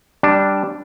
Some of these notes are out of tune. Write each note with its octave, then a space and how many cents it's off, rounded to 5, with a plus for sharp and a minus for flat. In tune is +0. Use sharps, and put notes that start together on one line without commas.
G3 -5 D4 +0